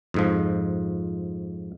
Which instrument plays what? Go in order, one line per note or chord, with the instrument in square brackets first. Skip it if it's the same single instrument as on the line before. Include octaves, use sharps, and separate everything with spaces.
[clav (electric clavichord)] F2 G#2 F3